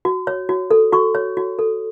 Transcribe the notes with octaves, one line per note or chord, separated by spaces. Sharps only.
F#4
C#5
F#4
A4
F#4 C#6
C#5
F#4
A4